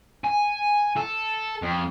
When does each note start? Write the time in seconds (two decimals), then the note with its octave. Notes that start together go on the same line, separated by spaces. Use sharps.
0.24 G#5
0.97 A4
1.62 F2